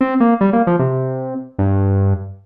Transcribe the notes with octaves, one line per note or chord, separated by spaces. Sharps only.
C4
A#3
G3
A#3
F3
C3
G2